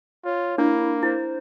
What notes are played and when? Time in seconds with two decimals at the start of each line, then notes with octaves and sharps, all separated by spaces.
0.25 F4 C#5
0.58 A#3 D4 E4
1.03 E4 C5